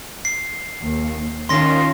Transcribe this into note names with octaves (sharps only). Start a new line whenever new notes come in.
C7
D#2
D#3 C#4 F4 C6 A#6